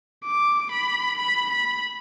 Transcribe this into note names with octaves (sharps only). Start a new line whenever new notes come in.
D6
B5
B5
B5